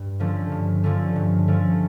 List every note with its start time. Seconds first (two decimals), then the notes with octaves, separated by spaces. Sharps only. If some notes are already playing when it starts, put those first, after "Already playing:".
Already playing: G2
0.20 D3 F3 A3 C#4
0.52 G2
0.83 D3 F3 A3 C#4
1.16 G2
1.48 D3 F3 A3 C#4